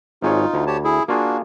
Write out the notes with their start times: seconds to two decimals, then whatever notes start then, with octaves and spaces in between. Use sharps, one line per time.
0.22 G#1 D#4 F4 G#4 C#5
0.54 D2
0.67 G4 C#5 A5
0.84 E4 G#4
1.08 A#3 D4 F4 F#4 G#4